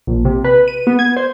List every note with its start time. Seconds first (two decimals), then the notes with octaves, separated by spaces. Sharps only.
0.07 A#1
0.25 C3
0.44 B4
0.68 D#7
0.87 B3
0.99 G#6
1.17 C5